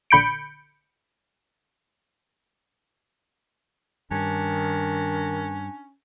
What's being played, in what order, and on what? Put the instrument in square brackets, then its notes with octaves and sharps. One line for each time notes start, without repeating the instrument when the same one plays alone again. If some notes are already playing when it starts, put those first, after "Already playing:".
[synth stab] A#1 D3 B5 G6 C#7 D7
[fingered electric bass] G2 [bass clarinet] D#3 [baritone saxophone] C#4 [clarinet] D4